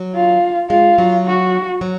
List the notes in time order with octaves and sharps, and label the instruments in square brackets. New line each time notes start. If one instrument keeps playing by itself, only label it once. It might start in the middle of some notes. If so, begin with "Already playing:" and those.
Already playing: [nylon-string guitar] F#3
[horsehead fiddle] F4
[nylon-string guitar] G#3 [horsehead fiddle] F4
[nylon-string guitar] F#3
[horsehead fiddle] F#4
[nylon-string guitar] F#3